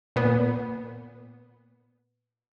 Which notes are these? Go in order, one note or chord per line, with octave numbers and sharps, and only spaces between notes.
A#2 B3